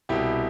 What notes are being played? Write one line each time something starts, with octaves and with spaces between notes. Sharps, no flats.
C2 B2 E4 G4